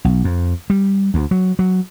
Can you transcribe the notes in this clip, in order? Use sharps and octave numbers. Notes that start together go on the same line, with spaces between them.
B1
F2
G3
D2
F#3
F#3